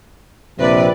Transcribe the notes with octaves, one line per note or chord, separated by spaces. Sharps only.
A#1 C3 B4 D5